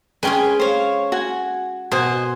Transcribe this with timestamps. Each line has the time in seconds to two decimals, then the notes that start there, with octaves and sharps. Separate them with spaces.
0.23 G#3 C#4 G#4 B4 G5 G#5
0.60 C5 C#5 F5
1.12 F#4 G#5
1.92 B2 C5 D#5 G#5